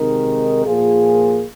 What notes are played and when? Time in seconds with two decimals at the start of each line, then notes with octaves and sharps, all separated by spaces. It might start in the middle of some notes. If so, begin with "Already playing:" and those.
Already playing: C3 D#3 G#3 D#4 A#4
0.66 A#2 F3 A#3 F4 G#4